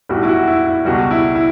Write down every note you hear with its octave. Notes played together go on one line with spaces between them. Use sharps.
B1 A2 G3 F#4
E4
F#4
E4
E4
C#2 B2 G3 F#4
E4
E4